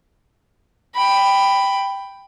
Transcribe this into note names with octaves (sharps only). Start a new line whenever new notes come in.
G5 B5